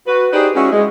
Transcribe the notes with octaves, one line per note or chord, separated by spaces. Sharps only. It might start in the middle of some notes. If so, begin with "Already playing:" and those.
F#4 B4
D#4 G4 G#4 B4 C5 D5
G#3 C#4 E4 F#4
G#3